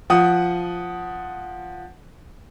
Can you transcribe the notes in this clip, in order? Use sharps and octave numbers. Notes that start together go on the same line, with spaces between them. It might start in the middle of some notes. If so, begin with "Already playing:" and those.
F3 F#5 D#6